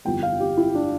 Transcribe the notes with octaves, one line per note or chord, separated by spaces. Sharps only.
G1 F2 E3 G3 B3 G5
F5
G4
E4
D4